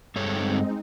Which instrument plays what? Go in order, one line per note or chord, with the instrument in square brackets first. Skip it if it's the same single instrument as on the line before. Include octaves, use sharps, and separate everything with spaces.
[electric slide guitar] G2 A4 C#5 [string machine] G#3 C4 D#4